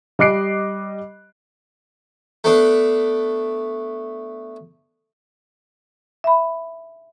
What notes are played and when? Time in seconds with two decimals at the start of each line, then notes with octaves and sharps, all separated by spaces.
0.19 G3 D#5 D6 F#6 C7 D7
2.44 A3 B3 D4
6.24 E5 B5